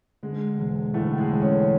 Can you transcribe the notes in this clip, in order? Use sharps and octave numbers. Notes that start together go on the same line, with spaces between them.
D3 G#3
E1
A2 D3 A3
G#3 G#4
E1
C#4 C#5